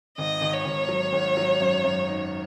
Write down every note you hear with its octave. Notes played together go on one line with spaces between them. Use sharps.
G#1 D#5
G#1
C#5
G#1
F#3
G#1
F#3
F#2
F#2
D#4